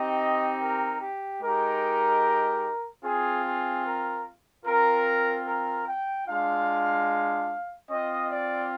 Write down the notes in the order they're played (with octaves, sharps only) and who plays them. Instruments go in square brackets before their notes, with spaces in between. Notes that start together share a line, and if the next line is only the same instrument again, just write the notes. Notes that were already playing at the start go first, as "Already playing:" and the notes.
Already playing: [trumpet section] C4 D#4 G4 D#5
A#4
G4
G#3 D#4 G4 A#4
C4 F4 G#4
G#4
A#4
C4 F4 A#4
A#4
G5
G#3 D4 F4 F5
C4 F4 D#5
D5